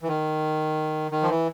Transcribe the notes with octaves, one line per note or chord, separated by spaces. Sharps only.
E3
D#3
D#3
F3
E3